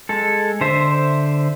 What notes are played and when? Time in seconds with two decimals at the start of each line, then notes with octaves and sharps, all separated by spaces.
0.09 G#3 A4
0.61 D3 C5 E5